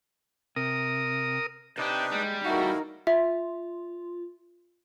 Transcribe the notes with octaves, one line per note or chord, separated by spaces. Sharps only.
C3 A#4 D#6
C3 D4 D#4 B4 G5
G3 G#3
E2 A#2 A3 D#4 E4 F#4 A#4 F5
F4 E5